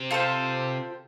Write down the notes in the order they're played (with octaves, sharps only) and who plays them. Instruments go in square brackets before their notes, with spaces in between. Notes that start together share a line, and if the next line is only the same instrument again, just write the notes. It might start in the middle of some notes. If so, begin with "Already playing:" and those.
Already playing: [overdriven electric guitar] C3
[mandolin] F4 A4 C5 G5